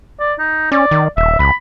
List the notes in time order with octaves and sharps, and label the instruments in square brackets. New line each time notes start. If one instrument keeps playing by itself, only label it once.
[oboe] D5
D#4
[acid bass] C#4 [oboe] D5
[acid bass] D#3
[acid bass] D#1 [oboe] E5
[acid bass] C#2 [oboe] B5